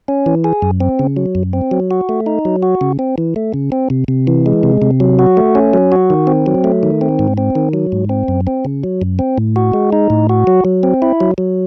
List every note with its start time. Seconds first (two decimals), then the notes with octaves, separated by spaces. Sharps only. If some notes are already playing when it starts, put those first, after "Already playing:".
0.08 C#4
0.26 E3
0.44 G#4
0.62 F#2
0.80 C4
0.99 C#3
1.17 F#3
1.35 F#2
1.53 C4
1.71 F#3
1.91 F#4
2.09 A3
2.26 D#4
2.45 F#3
2.63 F#4
2.81 C#3
2.99 C4
3.18 E3
3.36 A3
3.54 C#3
3.72 C4
3.90 C3
4.08 C3
4.27 E3
4.46 G#3
4.63 C3
4.82 C3
5.00 F#3
5.19 F#4
5.37 A3
5.55 C#4
5.73 F#3
5.92 F#4
6.10 D#3
6.27 C4
6.46 F#3
6.64 A3
6.83 D#3
7.01 C4
7.19 G#2
7.38 C4
7.55 D#3
7.73 F#3
7.92 G#2
8.09 C4
8.28 F#2
8.47 C4
8.65 C#3
8.84 F#3
9.02 F#2
9.19 C4
9.38 A2
9.56 F#4
9.74 G#3
9.93 D#4
10.10 A2
10.29 F#4
10.47 F#3
10.65 F#3
10.83 C4
11.02 E4
11.20 F#3
11.38 F#3